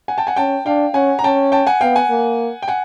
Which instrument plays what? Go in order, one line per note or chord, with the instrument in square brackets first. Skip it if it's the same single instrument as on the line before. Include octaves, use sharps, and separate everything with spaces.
[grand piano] F#5 G#5
G5 A5
F#5 G#5
[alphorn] C#4 [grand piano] G5 A5
[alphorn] D4 [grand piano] F5 G5
[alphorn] C#4 [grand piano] F#5 G#5
[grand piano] A#5
[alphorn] C#4 [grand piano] G5 A5
[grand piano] G5 A5
F#5 G#5
[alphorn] B3 [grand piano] F5 G5
[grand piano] F#5 G#5
[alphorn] A#3
[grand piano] G5
F#5 G#5